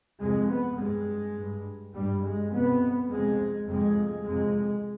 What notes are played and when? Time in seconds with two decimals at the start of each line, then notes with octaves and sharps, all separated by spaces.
0.20 F2 C3 G#3
0.48 B3
0.78 G2 G#3
1.36 G2
1.94 G2 G3
2.23 G#3
2.52 F2 C3 B3
3.10 F2 C3 G#3
3.68 F2 C3 G#3
4.25 F2 C3 G#3